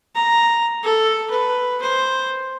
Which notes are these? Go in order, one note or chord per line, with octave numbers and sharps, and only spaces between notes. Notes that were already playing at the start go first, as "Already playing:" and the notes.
A#5
A4
B4
C5